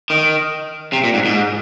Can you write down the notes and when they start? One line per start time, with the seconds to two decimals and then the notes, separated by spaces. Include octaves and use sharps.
0.10 D#3
0.93 C3
1.04 A#2
1.14 G#2
1.25 G#2